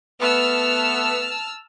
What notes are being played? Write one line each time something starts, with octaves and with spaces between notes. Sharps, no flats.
A3 B3 A5 E6 F6